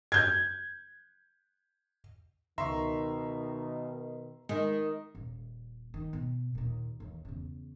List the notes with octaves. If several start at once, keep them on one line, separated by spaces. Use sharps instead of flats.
G6 G#6
C#2 B2 D#3 E5 A#5 C6 C#6
D#3 G#3
D#1
D#3
B2
D#2 A#2
D#2 E3
E2 C#3